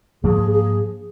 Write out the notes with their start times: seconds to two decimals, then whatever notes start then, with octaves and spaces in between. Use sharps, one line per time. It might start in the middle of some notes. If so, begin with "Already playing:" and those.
0.24 G#2 F3 A#3 D4 G#4
0.51 G#4